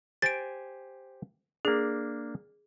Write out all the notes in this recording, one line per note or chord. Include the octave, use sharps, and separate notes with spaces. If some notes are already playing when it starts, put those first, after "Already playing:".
G4 C5 G#5 A6 D7
A#3 D4 G#4